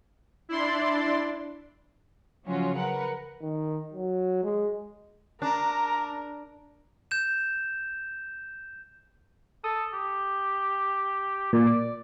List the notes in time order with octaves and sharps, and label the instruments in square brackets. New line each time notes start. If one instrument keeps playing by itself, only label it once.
[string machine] D4 D5 [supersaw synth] E4 C6
[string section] C#3 F3 F#3 C#4 F4 F#4
A#4 B4 F#5
[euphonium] D#3
F#3
G#3
[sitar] D4 [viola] A#4 [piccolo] A#5
[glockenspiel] G6 E7
[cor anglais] A4 [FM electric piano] D#6
[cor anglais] G4
[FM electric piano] A#2 [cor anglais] D5
[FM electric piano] D6